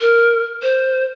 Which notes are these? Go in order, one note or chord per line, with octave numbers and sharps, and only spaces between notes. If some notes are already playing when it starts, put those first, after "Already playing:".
A#4
C5